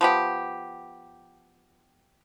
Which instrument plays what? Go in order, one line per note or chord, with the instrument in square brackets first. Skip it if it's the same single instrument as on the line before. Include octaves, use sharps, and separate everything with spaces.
[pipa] F3 B3 G4